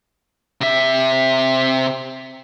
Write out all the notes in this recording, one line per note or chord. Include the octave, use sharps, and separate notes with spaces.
C3 E5